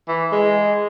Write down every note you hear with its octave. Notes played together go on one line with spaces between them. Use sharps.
E3
G#3